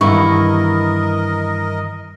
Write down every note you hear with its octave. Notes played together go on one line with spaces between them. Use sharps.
G2 D#3 E3 B3 E4 A#4 D#5 C#6